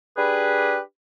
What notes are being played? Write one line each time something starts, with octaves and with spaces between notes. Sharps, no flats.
D4 G4 G#4 B4